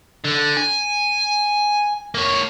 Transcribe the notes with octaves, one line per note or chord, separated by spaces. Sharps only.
D3
G#5
A#3 C#5